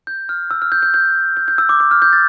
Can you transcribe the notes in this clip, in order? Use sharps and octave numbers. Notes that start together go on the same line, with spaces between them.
G6
F6
E6
F6
G6
G6
G6
G6
G6
E6
D6
D6
F6
G6
A6